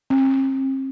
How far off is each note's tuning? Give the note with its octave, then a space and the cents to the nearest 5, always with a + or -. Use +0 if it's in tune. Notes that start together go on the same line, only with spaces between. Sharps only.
C4 +40